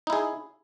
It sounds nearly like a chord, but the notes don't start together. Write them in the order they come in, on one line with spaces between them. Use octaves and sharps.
D#4 E4 G#4